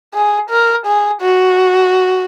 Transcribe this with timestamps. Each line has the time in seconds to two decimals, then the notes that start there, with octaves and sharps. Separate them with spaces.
0.14 G#4
0.50 A#4
0.86 G#4
1.21 F#4